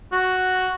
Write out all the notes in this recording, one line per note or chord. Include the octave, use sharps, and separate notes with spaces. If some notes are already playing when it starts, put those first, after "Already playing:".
F#4